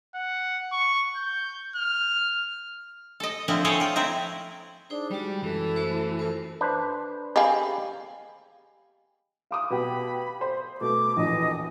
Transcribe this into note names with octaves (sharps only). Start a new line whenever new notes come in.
F#5
C#6
G6
F6
A4 D#5
D3 F3 C4 E4 D#5
G#4 A4 C5 C#5 G5 A#5
F4 G5
C4 E4 G5 A#5
D4 D#4 G#4 C5
G3 G#3 F#4 G4
F#2 E3 A4
A3 F#4 C5
F4 A4 A#4 C5
D4 B4 C5
G4 G#4 D#5 F5 B5
F5 D6 D#6
B2 B3 G4 B5
C5
B2 A3 D6
A#1 E2 D#5